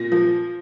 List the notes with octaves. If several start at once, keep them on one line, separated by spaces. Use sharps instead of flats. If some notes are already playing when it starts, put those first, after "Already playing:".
Already playing: A#2 A#6
F3